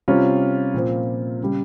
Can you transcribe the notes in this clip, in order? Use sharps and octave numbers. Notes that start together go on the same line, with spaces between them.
C3 G3 C#4 F4
A#2 F3 C4
C#3 G3